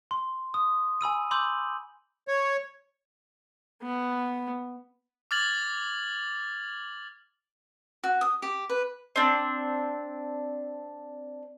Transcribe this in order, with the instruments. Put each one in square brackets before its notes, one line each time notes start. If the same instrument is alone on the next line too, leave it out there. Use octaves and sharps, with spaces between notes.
[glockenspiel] C6
D#6
G#5 B5 E6 D#7
B5 C6 D6 E6 G6 F#7
[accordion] C#5
[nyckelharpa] B3
[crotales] D6 F6 G#6 A6 F7 F#7
[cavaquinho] F#4
D#6
G4
B4
[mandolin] C4 D4